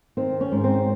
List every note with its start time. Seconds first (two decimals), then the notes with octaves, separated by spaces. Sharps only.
0.17 D#3 C4
0.41 C#4
0.52 G#2
0.64 C4